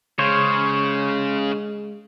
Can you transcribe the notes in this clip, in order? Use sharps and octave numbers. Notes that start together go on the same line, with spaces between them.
C#3 G#3 C5 C#5